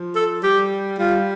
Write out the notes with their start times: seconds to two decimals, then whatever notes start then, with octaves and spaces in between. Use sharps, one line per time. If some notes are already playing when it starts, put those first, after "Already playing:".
Already playing: F3
0.16 A4
0.43 G3 G4
0.99 G3 F4